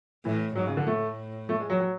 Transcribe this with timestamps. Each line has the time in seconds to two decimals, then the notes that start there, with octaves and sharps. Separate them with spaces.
0.25 A2 E3
0.55 G#2 F#3
0.67 C#3
0.77 D3
0.87 A2 A3
1.49 A3
1.60 G#3
1.70 F#3
1.80 F#3